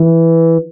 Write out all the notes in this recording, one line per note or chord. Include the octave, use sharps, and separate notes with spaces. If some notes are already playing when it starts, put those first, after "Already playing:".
Already playing: E3